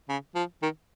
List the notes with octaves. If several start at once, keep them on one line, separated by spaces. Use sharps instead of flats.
C#3
F3
D#3